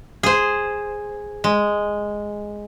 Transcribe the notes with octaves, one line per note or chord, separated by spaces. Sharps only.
G#4 C5
G#3